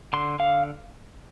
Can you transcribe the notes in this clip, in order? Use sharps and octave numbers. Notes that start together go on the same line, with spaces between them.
D3 C6
D3 F5